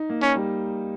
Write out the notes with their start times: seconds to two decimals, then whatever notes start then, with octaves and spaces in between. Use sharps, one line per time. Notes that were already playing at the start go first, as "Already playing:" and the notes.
Already playing: D#4
0.09 A#3
0.22 C#4
0.35 G3